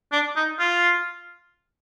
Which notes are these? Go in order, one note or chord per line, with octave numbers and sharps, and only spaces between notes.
D4
D#4
F4